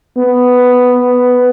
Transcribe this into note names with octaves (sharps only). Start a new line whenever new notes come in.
B3